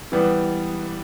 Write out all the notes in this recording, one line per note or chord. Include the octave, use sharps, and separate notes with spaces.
E3 G3 B3